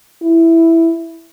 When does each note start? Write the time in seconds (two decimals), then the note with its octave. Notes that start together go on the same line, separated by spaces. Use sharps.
0.22 E4